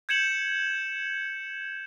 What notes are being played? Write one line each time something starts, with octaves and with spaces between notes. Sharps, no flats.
G6 G#6 C#7 E7 F#7